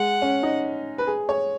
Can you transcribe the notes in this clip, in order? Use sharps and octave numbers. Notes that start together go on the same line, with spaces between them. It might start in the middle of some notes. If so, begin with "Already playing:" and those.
Already playing: G#3 F#5
C#4
D#4
B4
G#4
C#5